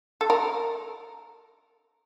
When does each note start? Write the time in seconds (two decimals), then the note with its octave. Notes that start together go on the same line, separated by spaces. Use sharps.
0.21 A4
0.30 A#4